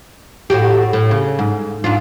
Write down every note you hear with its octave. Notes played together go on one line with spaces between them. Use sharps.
A2 F#4 G4
A2
C#3
G#2
G#2 D4 F4